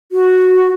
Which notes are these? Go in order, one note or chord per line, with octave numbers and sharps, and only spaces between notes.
F#4